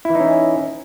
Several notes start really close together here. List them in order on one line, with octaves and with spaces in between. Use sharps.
E4 E3 D#4 C#4